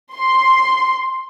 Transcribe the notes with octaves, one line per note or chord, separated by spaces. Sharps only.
C6